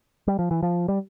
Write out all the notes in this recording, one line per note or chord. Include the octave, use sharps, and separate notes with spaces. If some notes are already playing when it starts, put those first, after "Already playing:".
G3
F3
E3
F3
G3